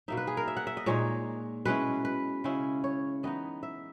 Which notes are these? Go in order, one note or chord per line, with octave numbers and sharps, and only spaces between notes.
B2 A#3 D#4 E5
B4
G#4
A#4
E5
F#5
E5
D#5
A#2 G#3 D#4 C#5
B2 G#3 C#4 E4 B4
B4
C#3 G#3 C#4 E4
C#5
E3 B3 D#4 D#5
E5